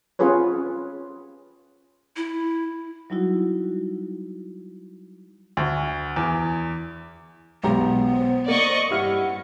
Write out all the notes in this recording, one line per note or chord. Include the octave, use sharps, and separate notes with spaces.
C4 C#4 F4 G#4 B4 C#5
E4
F#3 G3 D#4 E4 F#4
D2
E2
B1 G#3 B3 G4 A#5
C5
A#3 D5 D#5 C#6
G2 E4 G4 F#5 F6